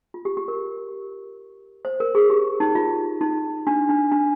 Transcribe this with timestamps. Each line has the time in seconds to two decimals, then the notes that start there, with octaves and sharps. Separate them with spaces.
0.14 F4
0.25 G4
0.37 G4
0.48 A#4
1.85 C5
2.00 A#4
2.15 G#4
2.30 G4
2.60 D#4
2.75 F4
3.21 D#4
3.67 D4
3.89 D4
4.12 D4